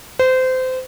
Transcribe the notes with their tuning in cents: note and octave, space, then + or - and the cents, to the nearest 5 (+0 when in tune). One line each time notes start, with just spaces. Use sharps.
C5 -25